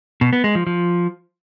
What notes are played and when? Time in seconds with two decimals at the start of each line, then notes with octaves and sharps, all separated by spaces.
0.21 B2
0.33 B3
0.44 G#3
0.55 F3
0.67 F3